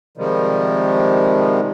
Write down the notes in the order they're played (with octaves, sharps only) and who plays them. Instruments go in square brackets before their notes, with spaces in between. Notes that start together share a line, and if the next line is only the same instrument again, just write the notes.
[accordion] C3 D#3 F3 G3 G#3